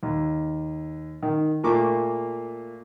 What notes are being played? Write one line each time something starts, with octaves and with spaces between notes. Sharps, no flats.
D#2
D#3
A#2 A3 A#3 C#6 D6